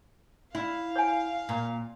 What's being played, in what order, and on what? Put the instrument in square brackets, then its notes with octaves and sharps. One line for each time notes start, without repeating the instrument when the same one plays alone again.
[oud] E4 [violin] F5
[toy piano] C#5 F#5 G#5
[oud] A#2